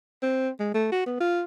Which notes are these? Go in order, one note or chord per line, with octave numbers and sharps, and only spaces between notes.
C4
G#3
A3
F#4
B3
F4